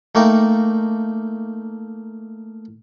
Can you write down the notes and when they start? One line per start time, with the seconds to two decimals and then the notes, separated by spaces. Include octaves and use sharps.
0.15 A3 A#3 D#4 G5